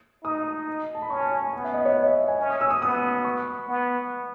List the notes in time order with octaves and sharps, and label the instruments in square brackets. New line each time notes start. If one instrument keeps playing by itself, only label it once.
[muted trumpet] D#4 [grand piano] D#6
[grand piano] A5
B5
[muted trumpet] C#4 [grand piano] C#6
[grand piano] A5
G#5
G#5
[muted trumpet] B3 [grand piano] G#5
[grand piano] E5
D#5
C#5
D#5
E5
G#5
[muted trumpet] C#4
[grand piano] D#6
E6
D#6
[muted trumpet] B3 [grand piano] D#6
[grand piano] C#6
[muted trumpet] B3